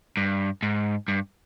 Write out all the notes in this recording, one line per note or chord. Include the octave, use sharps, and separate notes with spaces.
G2
G#2
G2